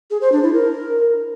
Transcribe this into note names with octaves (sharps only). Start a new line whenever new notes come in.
G#4
C5
D4
E4
A#4